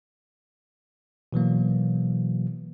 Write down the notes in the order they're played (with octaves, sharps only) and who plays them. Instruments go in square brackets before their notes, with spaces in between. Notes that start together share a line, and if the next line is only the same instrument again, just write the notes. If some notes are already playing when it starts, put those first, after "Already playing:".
[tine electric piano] B2 E3 F#3 A#3